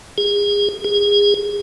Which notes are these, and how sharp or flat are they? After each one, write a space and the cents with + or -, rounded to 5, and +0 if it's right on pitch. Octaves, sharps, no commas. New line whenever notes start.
G#4 -30
G#4 -25